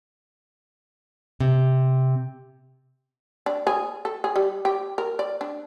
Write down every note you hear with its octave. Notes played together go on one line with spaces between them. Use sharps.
C3
D4
G#4
A4
G#4
G3
G4
A#4
D5
D4